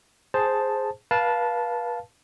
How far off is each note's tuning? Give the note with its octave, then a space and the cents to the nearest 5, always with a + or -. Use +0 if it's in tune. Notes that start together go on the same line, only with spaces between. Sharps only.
G#4 +0 C5 +0 A5 +0
B4 -35 F5 +0 A5 -10